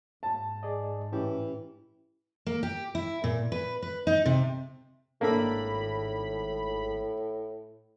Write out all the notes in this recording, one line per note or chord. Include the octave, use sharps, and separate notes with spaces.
G#2 A5
G#4 D5 D#5
A2 E3 C#4 G4
A#3
G4
E4
A#2
B4
B4
D#4
C3
G#1 A2 A#3 D4 A4 B5